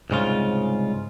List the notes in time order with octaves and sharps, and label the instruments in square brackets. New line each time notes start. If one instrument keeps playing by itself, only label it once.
[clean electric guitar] C2 G#2 C#3 F4